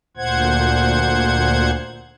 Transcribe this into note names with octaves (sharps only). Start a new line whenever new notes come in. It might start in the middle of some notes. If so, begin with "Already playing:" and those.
D2 A#2 C5 F#5 G#6